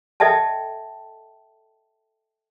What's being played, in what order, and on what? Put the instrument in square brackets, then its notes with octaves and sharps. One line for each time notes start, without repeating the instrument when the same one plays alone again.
[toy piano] A4 D#5 E5 G5 A5